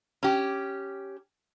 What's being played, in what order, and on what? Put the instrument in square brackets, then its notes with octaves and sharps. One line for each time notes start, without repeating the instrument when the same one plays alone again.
[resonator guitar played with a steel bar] C#4 G4